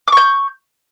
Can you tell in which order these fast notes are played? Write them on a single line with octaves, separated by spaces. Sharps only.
D6 C#6 G6